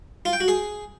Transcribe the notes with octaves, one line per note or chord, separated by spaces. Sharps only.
F4
G5
F#4
G#4